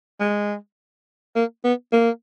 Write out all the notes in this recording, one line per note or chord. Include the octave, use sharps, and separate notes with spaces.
G#3
A#3
B3
A#3